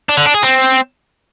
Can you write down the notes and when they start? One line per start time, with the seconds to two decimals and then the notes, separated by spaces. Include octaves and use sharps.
0.09 D4
0.18 D3
0.26 D4
0.34 G#4
0.43 C4